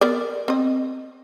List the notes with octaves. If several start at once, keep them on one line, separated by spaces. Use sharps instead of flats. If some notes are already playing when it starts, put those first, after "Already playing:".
B3 A#4 D5
C4 D#5